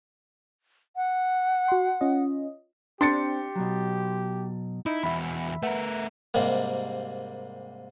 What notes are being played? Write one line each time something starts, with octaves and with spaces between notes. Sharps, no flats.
F#5
F#4 C6
C#4 F4 D#5
C4 D4 G4 C6 A6 C#7
B2 F#3
D#4 E4
E2 F#4 E5 B5
A3 A#4 B4 E5 F#5
G#2 C3 G3 A#3